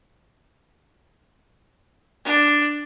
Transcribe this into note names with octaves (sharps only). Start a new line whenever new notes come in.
D4